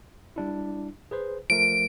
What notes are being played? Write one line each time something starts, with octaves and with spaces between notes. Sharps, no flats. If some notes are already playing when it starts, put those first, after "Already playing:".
G3 D4 E4
G#4 B4 C5
F3 A3 A#4 D7